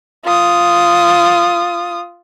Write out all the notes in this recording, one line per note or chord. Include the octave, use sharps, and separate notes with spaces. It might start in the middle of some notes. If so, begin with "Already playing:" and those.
F4 D#6